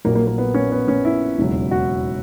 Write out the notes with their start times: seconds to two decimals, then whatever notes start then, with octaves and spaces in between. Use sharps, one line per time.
0.05 A#1 A#2 F#3 A#3
0.15 A#3
0.27 A#3
0.38 B3
0.54 C#4
0.72 B3
0.88 C#4
1.05 E4
1.38 E1 D#2 C#3 F#3
1.71 F#4